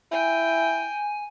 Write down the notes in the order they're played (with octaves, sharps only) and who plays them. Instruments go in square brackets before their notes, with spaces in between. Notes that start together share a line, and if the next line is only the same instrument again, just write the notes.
[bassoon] E4 [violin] G5 [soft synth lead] G#5